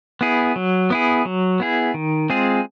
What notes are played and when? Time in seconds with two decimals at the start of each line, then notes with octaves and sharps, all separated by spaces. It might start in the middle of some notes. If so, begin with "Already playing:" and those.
0.21 B3 E4 G#4
0.56 F#3
0.90 B3 E4 G#4
1.25 F#3
1.60 B3 E4 G#4
1.94 D#3
2.30 G#3 C4 F4 G#4